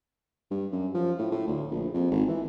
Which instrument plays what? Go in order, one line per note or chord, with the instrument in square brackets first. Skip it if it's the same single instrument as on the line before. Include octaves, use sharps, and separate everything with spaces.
[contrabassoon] G2
F#2
F3
A2
A2
D2
A#1
F2
G#1
E3